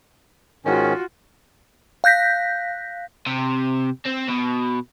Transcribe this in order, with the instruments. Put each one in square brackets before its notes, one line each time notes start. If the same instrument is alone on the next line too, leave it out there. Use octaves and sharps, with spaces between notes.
[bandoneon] G#2 D#3 C#4 [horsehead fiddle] F4 F#4
[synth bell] F5 F#6 G6 A#6 B6
[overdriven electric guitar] C3
C4
B2